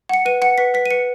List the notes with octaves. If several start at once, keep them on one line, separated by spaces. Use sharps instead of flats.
F#5 C#7
B4 D#7
F#5 C#7
B4 B6
B4 B6
D#7
B4 C#7